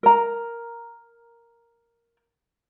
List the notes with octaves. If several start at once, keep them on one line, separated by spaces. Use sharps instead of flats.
A#4 A#5